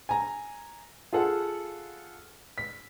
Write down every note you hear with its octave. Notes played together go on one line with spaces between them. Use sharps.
G#5 A#5
F4 G#4 A4 F#5
B6